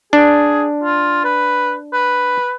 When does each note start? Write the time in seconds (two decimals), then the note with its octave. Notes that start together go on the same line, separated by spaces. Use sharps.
0.13 D4 G#4
0.84 F4
1.25 B4
1.93 B4